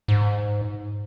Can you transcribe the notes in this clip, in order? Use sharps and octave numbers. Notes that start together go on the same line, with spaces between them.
G#2